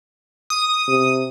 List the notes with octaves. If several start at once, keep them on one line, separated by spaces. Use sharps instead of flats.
D#6
C3